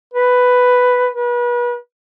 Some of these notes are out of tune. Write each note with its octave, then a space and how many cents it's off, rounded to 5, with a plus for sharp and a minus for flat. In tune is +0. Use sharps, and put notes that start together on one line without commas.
B4 +5
B4 -35